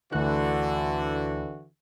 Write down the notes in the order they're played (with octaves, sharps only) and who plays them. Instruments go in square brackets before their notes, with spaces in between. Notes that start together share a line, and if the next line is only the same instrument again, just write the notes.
[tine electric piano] D2 F#6 [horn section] D3 E3 F#4